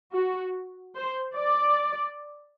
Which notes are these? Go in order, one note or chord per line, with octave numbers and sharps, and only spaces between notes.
F#4
C5
D5